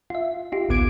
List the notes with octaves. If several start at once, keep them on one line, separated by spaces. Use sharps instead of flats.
F4 E5
D#4 F4 G4
A1 D2 B3 D6 G#6 D7